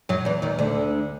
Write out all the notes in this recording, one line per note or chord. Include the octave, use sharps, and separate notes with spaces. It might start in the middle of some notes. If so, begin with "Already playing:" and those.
F#2 F#3
E2 E3
D#2 D#3
D2 D3